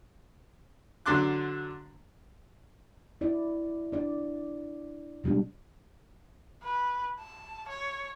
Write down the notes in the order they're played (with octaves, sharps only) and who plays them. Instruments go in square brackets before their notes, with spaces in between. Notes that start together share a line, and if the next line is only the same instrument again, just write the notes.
[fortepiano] D3 F#3 D4 C6 D6 F#6
[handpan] E4 D5
D4 D5
B2 G3 G#3 D4
[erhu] B4
A5
C#5